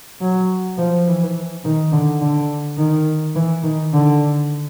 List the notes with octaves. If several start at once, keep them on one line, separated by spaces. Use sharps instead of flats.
F#3
F3
E3
D#3
D3
D3
D#3
E3
D#3
D3